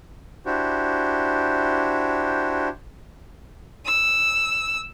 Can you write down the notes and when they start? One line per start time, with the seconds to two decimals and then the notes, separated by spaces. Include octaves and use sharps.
0.46 D4 E4 F#4 G4 C5
3.86 E6